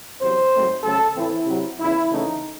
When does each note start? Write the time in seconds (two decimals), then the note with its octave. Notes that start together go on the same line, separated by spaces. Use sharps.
0.19 E2 C3 F#3 C5
0.51 G#2 F#3 A3 C4
0.83 C#3 F#3 A3 A4
1.15 A2 E3 A3 C4 E4
1.47 C3 F#3 C4
1.79 E2 C#3 E3 E4
2.11 C#3 E3 A3 C4 D#4